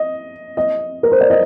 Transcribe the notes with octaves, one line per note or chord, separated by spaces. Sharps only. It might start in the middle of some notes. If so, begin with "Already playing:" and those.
Already playing: D#5
D#5
A#4
C5
D5
D#5